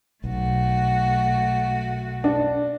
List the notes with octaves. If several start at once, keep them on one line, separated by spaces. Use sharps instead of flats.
B1 A3 F#4
D4